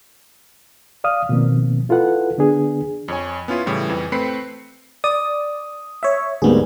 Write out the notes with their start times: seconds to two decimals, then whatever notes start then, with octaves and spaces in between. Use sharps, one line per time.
1.04 D5 F5 D#6 F6
1.29 B2 D#3 F3 A#3 C4
1.89 E4 F4 A4 B4 F#5
2.38 D3 B3 D4 G#4
3.08 F2 C#5 G#5
3.48 B3 C#4 E4 F4
3.66 A2 C#3 E3 G3
3.89 F2 E3
4.12 A3 C4 B4 B5 C7 C#7
5.04 D5 D#6
6.03 C#5 E5
6.42 D2 G#2 G3 A#3 B3 G#4